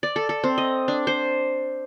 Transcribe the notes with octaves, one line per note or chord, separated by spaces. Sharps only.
D5
A4
A4
C4
D#5
D4
C5